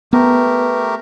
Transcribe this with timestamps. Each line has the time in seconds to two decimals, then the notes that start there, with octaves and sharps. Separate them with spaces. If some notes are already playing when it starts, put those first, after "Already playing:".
0.13 A3 B3 G4 A#4 B4 A#5